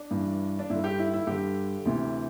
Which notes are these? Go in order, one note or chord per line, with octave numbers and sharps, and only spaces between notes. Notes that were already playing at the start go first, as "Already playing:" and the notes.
Already playing: D4
G2 E3
D4
G2 D3 E4
G4
E4
E4
G2 D3 G4
D2 C3 E3